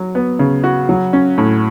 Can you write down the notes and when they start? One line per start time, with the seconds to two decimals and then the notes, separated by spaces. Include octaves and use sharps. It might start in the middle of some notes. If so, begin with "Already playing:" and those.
Already playing: F#3 F#4
0.15 B3
0.39 C#3
0.64 F#4
0.89 F#3
1.13 C#4
1.38 A2